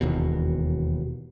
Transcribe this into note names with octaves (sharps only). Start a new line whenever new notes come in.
E1 D#2 B2